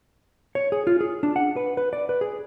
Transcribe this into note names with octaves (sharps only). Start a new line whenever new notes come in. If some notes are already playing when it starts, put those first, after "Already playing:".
C#5
G#4
F4
G#4
D4
F#5
B4
B4
D5
B4
G#4